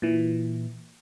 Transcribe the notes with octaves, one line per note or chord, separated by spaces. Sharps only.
A#2 E3